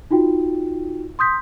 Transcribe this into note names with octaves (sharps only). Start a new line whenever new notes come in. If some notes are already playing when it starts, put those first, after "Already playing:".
D#4 F4 F#4 G5
C6 D#6 G6 B6